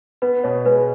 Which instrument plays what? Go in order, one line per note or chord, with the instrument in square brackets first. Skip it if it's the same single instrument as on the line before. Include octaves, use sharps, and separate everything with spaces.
[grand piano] B3 [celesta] B4
[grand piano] B2 [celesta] C#5
[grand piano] G#3 [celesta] B4